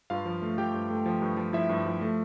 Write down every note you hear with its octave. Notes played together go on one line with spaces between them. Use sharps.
G2 F4 F5
F3
A3
F3 G4 G5
G2
A3
F3
G2
F3
F3 E4 E5
G2
F3
A3